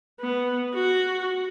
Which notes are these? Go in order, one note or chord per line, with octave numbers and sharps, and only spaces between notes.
B3
F#4